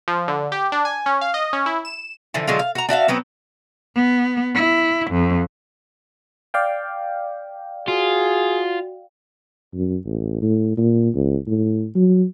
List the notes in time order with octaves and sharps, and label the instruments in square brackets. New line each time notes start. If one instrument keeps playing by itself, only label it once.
[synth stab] F3
D3
G4
D4
G#5
C#4
F5
D#5
C#4
E4
E7
[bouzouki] D3 E3 F3
D3 F#3 G#3 F4
F5
F#4 A#5
D4 F#4 E5 F5
F#3 B3 C4
[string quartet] B3
E4
F2
[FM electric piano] D5 F5 G5
[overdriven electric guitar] F4 [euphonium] F#4 [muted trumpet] G#4
[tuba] F#2
A1
A2
A#2
C#2
A2
F#3